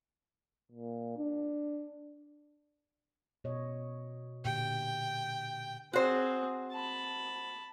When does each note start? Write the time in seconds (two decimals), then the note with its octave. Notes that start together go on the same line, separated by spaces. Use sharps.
0.72 A#2
1.18 D4
3.44 B2 C#5 D#5
4.45 A#2 D3 G4 G5
5.93 C4 F#4 G#4 C5
6.72 A5 B5